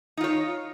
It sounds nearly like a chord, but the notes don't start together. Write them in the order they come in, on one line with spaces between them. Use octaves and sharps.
D#4 F4 C#5